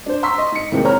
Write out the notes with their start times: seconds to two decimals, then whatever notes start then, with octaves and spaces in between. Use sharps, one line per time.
0.06 D4 C5
0.23 A#5 C6 C#6 E6 B6
0.38 D#5
0.52 G#2 C#7
0.72 D#2 A2 C3 G#3 A#3 C4
0.84 C5 C#5 A#5 F6